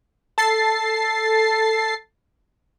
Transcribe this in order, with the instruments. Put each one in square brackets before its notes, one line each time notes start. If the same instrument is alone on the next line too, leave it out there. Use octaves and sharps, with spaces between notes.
[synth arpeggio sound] A4 A6 C7